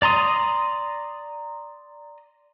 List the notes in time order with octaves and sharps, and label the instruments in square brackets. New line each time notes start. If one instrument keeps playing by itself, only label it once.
[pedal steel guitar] D5 A#5 C6 D#6